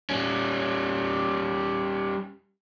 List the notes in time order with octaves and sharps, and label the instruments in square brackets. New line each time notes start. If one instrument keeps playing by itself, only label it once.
[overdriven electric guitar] G3 C#4